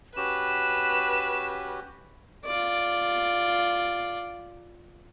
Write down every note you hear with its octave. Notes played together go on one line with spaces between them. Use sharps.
C#4 F#4 G4 B4 E7
F4 D5